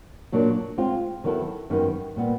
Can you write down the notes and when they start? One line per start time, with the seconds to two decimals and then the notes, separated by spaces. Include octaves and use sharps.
0.32 A#2 F#3 A#3 D4
0.78 G#3 C4 F4
1.24 D#3 F#3 B3 E4 A4
1.70 F#2 D#3 G3 B3
2.16 A#2 G3 B3